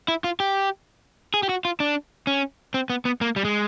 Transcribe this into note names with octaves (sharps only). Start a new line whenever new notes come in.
E4
F4
G4
G#4
G4
F#4
F4
D4
C#4
C4
B3
B3
A#3
G3
G#3